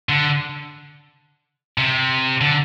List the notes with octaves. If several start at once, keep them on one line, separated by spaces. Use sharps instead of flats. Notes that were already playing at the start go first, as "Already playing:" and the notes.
D3
C3
D3